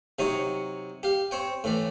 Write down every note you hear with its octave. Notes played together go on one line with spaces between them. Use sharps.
C3 F#3 D#4 C#5
G4 F5
C4 C#5 G5
A2 E3 D5